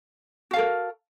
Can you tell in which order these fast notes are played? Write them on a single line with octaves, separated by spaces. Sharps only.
F#4 F5 A4 A#4